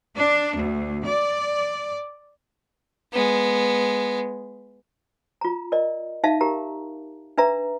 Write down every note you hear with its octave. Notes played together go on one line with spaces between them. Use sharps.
D4
D2
D5
G#3 B3
F4 A#5
A#4 D5 D#5
D#4 E5 F5 A5
G4 A#4 A#5
D4 B4 E5 A#5